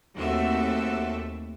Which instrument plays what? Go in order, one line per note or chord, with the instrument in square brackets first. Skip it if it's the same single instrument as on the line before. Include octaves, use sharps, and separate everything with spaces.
[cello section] D#2 A3 C4 F#4 A4 E5